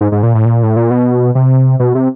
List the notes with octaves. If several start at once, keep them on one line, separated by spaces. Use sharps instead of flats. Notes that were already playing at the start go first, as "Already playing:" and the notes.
G#2
G#2
A#2
A2
A#2
A2
A#2
B2
C3
B2
C3